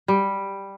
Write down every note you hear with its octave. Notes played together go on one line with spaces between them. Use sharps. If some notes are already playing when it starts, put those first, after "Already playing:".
G3